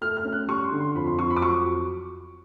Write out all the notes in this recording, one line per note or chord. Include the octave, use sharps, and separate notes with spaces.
A3 F6
F6
C#4
F#6
G3 C#6
C6
D3
C6
F2 B5
C6
F2 C#6
B5
D6
F#3 C#6